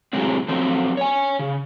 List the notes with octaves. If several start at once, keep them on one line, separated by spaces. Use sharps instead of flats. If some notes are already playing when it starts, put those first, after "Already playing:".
A2 C3 F#3 G#3 C4
F3 F#3 A3 C4
C#5 G#5
C#3